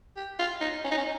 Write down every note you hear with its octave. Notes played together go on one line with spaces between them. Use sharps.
G4
F4
D#4
C#4
D#4
C#4